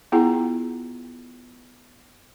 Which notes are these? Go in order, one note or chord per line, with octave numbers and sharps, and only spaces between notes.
B3 E4 F4 G#4 F#5 A#5